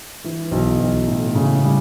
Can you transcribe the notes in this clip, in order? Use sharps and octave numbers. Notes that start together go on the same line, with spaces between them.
E3
B1
B1
A2
C#3
G3